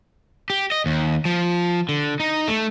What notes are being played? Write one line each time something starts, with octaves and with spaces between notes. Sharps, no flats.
G4
D#5
D#2
F3
D3
D#4
A3